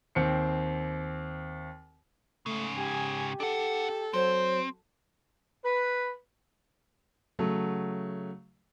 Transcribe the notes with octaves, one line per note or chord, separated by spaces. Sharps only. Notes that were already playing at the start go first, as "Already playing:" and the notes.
D#2 C4 C#7
G#2 C#3 A3
G4 G#5
D4 A4 F#5
F#3 C4 C5
B4
C#3 F#3 A3